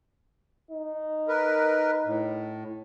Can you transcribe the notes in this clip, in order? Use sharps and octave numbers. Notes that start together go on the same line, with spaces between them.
D#4
A#4 B4
A2